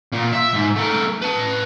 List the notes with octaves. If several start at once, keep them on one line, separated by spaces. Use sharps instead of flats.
A#2
E5
G#2
A3 A#4
B4 A5